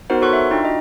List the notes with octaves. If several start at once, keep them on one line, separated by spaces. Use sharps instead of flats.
B3 D#4 F#4 A#4 C5 F#5
F#4 A4 C#5 C6 C#6 F#6
E5
D4 D#4 F4 G5
F#4 D#5